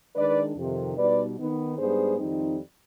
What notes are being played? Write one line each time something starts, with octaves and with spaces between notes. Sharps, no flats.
D#3 G#3 D4 B4 D5
F2 C3 D#3
B2 G3 B3 D#4 B4 D5
D#3 B3 D#4
G#2 G3 B3 D4 G#4 C5
F2 D#3 G3 C4 D#4